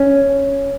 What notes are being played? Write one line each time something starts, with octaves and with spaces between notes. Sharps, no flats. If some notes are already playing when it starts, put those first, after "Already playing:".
Already playing: C#4